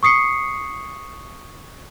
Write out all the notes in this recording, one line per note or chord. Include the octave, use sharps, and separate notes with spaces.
C#6 D#6 C7 C#7